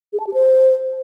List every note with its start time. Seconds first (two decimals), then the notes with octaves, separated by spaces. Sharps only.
0.13 G#4
0.20 A5
0.27 G4
0.34 C5